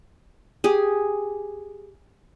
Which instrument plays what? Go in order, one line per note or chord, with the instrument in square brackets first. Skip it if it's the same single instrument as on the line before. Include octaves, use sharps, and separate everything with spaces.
[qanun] G4 G#4